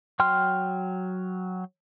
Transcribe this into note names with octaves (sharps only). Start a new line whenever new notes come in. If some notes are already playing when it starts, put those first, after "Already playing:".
F#3 G5 C6 F6